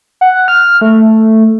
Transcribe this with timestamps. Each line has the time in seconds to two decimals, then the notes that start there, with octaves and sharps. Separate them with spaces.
0.21 F#5
0.48 F6
0.81 A3